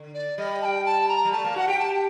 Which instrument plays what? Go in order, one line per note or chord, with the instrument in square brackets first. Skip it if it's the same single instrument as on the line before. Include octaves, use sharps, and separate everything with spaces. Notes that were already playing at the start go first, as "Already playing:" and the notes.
Already playing: [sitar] D3
[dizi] D5
[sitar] G3 [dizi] D#5
[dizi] A5
G5
A5
A#5
[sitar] G3
[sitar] A3 [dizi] A5
[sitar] A#3
[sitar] F#4 [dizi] F#5
[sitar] G4 [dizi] G5
[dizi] A5
G5